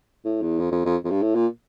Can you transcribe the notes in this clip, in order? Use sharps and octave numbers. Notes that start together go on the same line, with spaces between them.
A2
E2
F2
F2
F2
F2
G2
A2
A#2